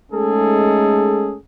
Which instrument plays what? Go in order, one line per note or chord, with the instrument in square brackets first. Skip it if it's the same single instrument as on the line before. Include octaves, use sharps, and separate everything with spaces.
[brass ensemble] G#3 A3 C#4 D#4 G#4 A4